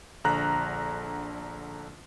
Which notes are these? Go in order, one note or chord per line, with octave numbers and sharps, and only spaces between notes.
A#1 D3 A#5 F#6